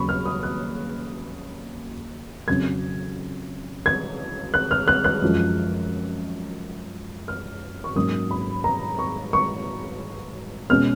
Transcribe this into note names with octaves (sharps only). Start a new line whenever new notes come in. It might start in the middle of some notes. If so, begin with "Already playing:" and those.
Already playing: D#2 C#3 F#3 B5 C#6
F6
D#6
F#6
F2 C#3 F#3 C#4 G#6
G#6
F#6
F6
F#6
F#6
F#2 F3 G#3
F6
C#6
G#2 F#3 A#3 C#4 D#6
B5
A#5
C#6
C#6
B2 G#3 C#4 F6